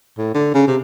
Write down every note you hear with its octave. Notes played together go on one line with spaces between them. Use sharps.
A2
D3
C#3
C3